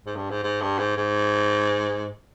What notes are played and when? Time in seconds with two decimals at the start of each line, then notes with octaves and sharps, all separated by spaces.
0.06 G#2
0.16 G2
0.31 G#2
0.44 G#2
0.62 G2
0.79 G#2
0.97 G#2